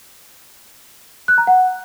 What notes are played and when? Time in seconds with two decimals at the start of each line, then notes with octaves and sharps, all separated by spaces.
1.28 F#6
1.38 A#5
1.47 F#5